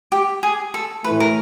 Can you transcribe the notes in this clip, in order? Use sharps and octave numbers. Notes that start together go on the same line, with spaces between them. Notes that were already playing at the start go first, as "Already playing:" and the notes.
G4
G#4
A4
A2 E3 A3 B4
A#4